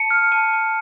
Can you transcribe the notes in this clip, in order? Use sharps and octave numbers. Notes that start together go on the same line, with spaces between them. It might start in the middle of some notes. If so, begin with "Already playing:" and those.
Already playing: A5 C#7
F6
A5
A5